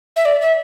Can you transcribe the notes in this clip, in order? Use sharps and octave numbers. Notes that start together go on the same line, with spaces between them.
E5
D5
E5